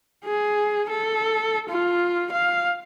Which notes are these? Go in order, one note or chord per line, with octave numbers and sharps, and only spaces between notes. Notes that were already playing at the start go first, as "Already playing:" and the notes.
G#4
A4
F4
F5